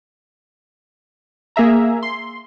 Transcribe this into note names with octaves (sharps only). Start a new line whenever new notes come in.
A#3 G#4 E5 A#5
C6